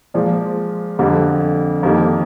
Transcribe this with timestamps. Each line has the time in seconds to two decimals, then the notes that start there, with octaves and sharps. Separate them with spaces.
0.14 A#2 F3 G#3
0.99 F2 D3 G3
1.83 F2 D#3 G3 A#3